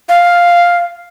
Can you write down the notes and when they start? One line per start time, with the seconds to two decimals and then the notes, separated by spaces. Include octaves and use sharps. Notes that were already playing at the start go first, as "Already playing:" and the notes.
0.09 F5